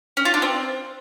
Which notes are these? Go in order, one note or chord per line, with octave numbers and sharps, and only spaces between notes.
C#4
F4
D4
C4